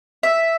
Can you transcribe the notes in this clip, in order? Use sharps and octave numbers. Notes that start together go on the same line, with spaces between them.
E5